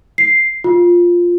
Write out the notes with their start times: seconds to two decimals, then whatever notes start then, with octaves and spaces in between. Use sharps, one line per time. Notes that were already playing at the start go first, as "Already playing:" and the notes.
0.18 C7
0.64 F4